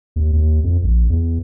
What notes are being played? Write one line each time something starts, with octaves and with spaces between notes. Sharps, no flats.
D#2
D#2
F2
A#1
E2